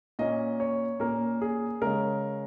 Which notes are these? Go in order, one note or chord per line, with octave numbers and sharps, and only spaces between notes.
A#2 A#3 C#4 D#5
C#5
A#2 A#3 C#4 A#4
G#4
C#3 G#3 C#4 A#4